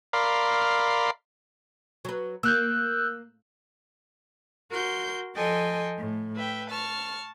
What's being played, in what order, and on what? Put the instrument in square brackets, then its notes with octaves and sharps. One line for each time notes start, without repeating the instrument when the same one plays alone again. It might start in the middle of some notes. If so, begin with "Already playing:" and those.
[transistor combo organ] A#4 D5 F5 B5 C6
[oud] F#3 B4
[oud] A#3 [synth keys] E6 F#6 G6
[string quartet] F#4 A#4 C6 G6
F3 A4 D#5 G5 G#5 C6
A2
B4 E5 G5
A5 C#6 F6